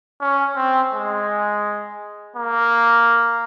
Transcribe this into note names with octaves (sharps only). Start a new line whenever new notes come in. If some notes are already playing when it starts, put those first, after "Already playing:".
C#4
C4
G#3
A#3